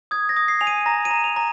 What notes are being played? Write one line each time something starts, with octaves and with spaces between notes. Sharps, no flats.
D#6 G#6
A#6
D#6
C7
G#5 F7
D#7
A#5 A#6
D#7
A#5
F7
A#5